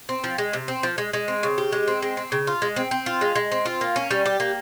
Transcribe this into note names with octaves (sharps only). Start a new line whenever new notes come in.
C4
F3
G#3
C3
C4
F3
G#3
G#3
C4
C#3
G4
G#3
C4
G#3
C4
C#3
F4
G#3
C4
C4
F4
G#3
G#3
C4
F4
A#3
C#4
G3
G4
A#3